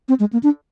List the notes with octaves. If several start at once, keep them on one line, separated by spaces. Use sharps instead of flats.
C4
G#3
A#3
D4